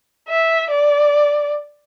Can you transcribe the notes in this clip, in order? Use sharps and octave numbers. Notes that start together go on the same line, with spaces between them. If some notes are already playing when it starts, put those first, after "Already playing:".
E5
D5